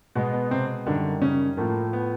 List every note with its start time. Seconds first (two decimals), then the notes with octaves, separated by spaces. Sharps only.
0.15 B2 G#3 B3
0.33 B3
0.51 C3 C4
0.86 F#2 D3 D#3 G3 D4
1.21 C#3 C#4
1.57 A2 F3 A3 A#3
1.93 B3